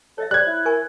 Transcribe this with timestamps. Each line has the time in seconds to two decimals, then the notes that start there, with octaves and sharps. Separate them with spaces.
0.18 A4 C#5 D#5 E5
0.31 G3 C5 C#5 B5 F#6 G#6
0.47 E4
0.65 A#4 G#5 C#6